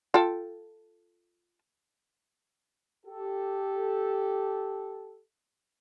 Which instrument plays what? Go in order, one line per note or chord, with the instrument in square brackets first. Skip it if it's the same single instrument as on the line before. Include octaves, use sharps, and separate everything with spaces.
[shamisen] F4 A4 G5
[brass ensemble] G4 A4